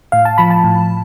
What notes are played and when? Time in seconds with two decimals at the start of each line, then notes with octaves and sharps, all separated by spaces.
0.12 A2 F5
0.25 A5
0.38 F3 B5
0.50 A5
0.64 A2